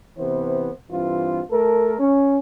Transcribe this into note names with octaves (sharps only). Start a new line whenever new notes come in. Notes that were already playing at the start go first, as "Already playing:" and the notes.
C3 E3 B3 C5
G2 E3 C4 F4
A3 A4 A#4
C#4